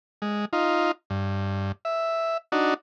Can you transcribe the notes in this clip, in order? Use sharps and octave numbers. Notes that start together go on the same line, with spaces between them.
G#3
D#4 F4
G2
E5
D4 D#4 F#4